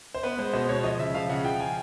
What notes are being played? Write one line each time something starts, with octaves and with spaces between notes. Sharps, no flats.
C5
B3 B4
G#3 C5
B2 C5
B2 C#5
F3 D#5
C#3 E5
F3 F5
C#3 F#5
F3 G5
G#5